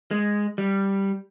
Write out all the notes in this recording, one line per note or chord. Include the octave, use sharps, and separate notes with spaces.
G#3
G3